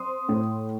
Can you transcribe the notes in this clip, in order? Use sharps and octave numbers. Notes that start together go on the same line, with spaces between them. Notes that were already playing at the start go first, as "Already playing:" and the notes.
Already playing: C4 C6 D#6
A2